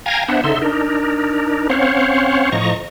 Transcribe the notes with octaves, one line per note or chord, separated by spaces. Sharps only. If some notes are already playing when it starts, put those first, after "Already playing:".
F5 G5 G#5 A#5 G#6 A#6
B3 D4 C5 E5 F#5
C#3 D#4 A4 E5 C6
D4 D#4 A#4
C4 C#4 C5 C#5 F5 F#5
A2 F3 D#5 A#5 C#6